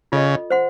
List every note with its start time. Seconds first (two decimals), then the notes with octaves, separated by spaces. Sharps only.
0.12 C#3 F4 A4 D#5
0.50 C5 F#5 C6